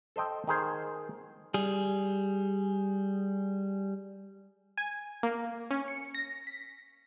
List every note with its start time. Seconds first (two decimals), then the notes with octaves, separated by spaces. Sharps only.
0.16 A4 C5 D#5 G5
0.47 D#3 G#4 C5
1.54 G3 G#4
4.78 G#5
5.23 A#3
5.71 C#4
5.88 C#7
6.15 A#6
6.47 B6